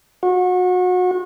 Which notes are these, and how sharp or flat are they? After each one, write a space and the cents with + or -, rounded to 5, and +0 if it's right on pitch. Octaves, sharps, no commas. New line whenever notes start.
F#4 -30